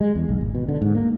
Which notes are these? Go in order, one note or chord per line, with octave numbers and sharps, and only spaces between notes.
G#3
E2
B1
G#1
B2
D3
G#2
A#3